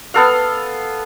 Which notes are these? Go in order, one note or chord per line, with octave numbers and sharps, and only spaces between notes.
B3 A4 F5